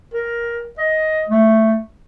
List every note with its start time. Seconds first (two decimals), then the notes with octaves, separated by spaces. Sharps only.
0.14 A#4
0.78 D#5
1.29 A3